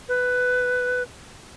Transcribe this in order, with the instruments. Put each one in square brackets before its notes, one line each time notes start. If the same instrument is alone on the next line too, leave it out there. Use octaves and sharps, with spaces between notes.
[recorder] B4